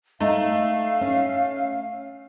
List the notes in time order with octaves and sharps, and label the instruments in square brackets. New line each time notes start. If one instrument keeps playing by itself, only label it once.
[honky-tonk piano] A3 [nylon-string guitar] D#4 [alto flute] F5
[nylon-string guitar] C#4